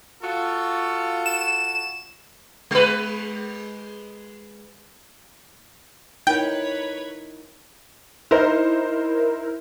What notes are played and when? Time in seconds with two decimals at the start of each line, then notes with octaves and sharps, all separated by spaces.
0.22 F4 F#4 A4
1.26 E7
2.71 G#3 B4
6.27 D#4 E4 A#4 B4 C#5 G5
8.31 D#4 E4 A#4 C5